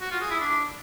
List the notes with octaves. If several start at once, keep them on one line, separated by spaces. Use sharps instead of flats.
F#4
F4
G#4
E4
D4